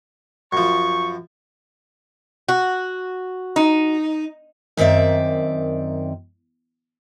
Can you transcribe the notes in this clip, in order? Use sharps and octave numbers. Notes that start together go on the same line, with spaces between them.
F#2 F3 C#6
F#4
D#4
F#2 D#3 C4 D5 E5